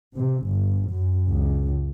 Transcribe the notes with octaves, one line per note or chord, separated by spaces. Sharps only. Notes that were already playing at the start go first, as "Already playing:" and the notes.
C3
G1
F#2
C#2